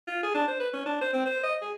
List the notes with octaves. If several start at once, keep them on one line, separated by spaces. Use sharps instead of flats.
F4
G#4
D4
C5
B4
C#4
D4
C5
C4
C5
D#5
G#4